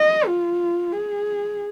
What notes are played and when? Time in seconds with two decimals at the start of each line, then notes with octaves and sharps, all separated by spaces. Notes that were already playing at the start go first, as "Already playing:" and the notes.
Already playing: D#5
0.27 F4
0.93 G#4